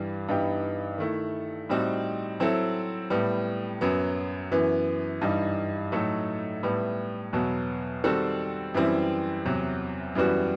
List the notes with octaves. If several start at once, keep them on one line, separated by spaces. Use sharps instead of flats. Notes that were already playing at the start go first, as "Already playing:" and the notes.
Already playing: G2 E3 G3
G2 E3 B3 D#4 G4
D#3 A3 E4
A2 G3 C4 D#4 F#4
F#3 C4 E4 A4
A2 G3 B3
F#2 F#3 B3
F#2 E3 B3
G2 E3 G3 D#4
A2 F#3 A3 D#4 A4
A2 G3 B3 E4
E2 B2 F#3 B3
D#3 G3 C4 F#4 A4
F#2 E3 G3 C4 E4
E2 C3 F#3
F#2 E3 G3 B3 F#4